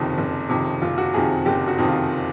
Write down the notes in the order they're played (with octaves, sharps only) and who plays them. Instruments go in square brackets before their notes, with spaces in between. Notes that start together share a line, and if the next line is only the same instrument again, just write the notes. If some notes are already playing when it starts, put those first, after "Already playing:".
Already playing: [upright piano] F#1 F2 C3 D#3
F#1
F2 C3 D#3
F#1 F4
F#4
F2 C3 D#3 G#4
F#1 G4
F#4
F2 C3 D#3
F4